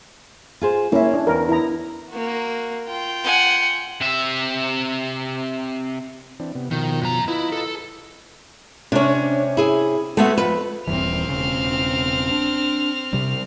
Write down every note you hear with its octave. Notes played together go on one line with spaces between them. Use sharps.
F4 G#4 C5
A#3 C#4 E4 E5
D4
E2 A#4
E4 A#5
A#3 F#4
F4 G5
F#5 G#5
C3 E5
E3 C4 D4
C3 B3
B2 D#3 F3
F#2 A#5
E4 F4 B4 D#5
A4
C3 C#4 D4 C#5
E4 G#4
G#3 A3 B3 F#4 E5
F2 B4
D#1 G2 E3 C4 F6
E1 C#3
D4
C3 G3